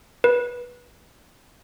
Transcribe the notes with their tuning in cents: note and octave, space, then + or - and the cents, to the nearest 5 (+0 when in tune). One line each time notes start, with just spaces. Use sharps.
B4 -20